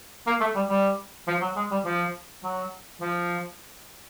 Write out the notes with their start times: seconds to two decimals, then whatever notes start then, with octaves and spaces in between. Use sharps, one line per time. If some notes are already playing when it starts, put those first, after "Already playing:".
0.27 A#3
0.41 A3
0.55 G3
0.70 G3
1.28 F3
1.41 F#3
1.56 G#3
1.71 G3
1.85 F3
2.44 F#3
3.01 F3